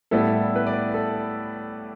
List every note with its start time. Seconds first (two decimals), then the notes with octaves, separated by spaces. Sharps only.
0.11 A2 G3 B3 E4 A4
0.56 B4
0.67 D5
0.94 A4